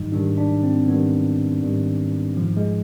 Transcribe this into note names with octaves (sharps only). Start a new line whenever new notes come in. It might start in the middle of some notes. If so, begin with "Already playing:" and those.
Already playing: G#2 D#3 G3 D#4
G#2 D#3 G3 D4
D4
C4
G#2 D#3 G3 B3
G#2 D#3 G3
G#2 F3
G#3